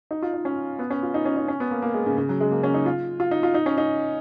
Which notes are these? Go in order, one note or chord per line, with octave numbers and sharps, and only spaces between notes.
D#4
F4
D#4
C#4
B3
C#4
F4
D#4
C#4
D#4
C#4
B3
A#3
A#3
G#3
C#3
C#3
F#3
G#3
A#3
C#4
D#4
F4
F4
D#4
F4
D#4
C#4
D#4